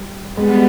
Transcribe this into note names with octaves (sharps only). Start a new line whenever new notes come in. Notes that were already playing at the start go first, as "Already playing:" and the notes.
Already playing: G3
G3 G#3 B3